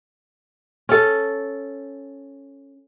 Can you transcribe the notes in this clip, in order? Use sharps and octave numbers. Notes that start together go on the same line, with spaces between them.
C#4 A4